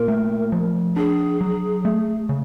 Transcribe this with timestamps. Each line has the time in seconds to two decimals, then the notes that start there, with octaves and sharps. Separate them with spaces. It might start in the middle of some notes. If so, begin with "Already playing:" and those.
Already playing: A#2 A#4
0.08 A3
0.52 F3
0.96 D4 G#4
1.41 F#3
1.85 A3
2.29 C#3